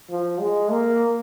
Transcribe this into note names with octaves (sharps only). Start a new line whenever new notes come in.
F3
G#3
A#3